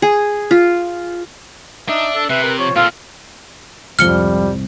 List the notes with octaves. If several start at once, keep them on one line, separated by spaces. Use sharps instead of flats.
G#4
F4
D4 D#4 E5
A4
C3 B4 E5
A#4
F3 C#5
A#2 C4 F4 A4
C2 F2 G#2 F3 G3 F6 C#7 G7